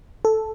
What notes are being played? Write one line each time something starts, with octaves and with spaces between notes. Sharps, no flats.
A4